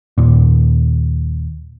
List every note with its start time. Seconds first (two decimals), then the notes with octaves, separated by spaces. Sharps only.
0.18 D#2 A#2